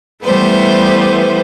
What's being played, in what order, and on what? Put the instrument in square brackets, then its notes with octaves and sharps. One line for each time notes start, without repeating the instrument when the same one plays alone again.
[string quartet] E3 G3 A3 B3 C5